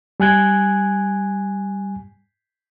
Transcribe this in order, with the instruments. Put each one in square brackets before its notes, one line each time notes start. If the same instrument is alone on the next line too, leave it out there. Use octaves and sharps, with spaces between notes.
[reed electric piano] G3 G#5 F#6 G#6